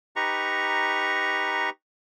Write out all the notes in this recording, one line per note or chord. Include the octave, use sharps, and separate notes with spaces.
D#4 G4 B4 A#5 C#6